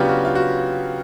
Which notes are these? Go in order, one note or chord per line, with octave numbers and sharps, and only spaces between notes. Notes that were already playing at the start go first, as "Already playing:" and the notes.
Already playing: C#3 F#3 B3 D4 F4 G4
F#4
F4
F#4